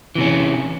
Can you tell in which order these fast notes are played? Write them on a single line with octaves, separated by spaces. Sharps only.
E3 C3 C#4